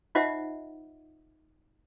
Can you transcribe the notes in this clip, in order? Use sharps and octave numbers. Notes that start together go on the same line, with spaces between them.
D#4 F4 C5 D#5 E5 F#5